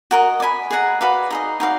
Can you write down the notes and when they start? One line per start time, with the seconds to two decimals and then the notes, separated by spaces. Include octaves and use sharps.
0.11 F#4 A#4 D#5
0.40 D5 G#5 B5
0.70 G#4 D#5 F#5 A#5
1.01 F#4 B4 D5 F5
1.30 D#4 G#4 D#5
1.60 D#4 F#4 D5 F5